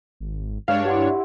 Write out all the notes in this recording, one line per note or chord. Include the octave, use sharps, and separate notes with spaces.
G#1
G2 G#3 D4 C#5 F5
E4 G4 F#5 C6